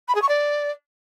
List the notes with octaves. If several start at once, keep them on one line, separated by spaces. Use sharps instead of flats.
B5
G#4
C#6
D5